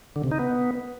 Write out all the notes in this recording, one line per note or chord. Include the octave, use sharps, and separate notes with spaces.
D3
C3
D#4
B3